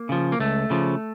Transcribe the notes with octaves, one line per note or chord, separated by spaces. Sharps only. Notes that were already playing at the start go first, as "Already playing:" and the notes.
Already playing: A#3
C#3 F3
A#3
C#2 A3
C#3 F3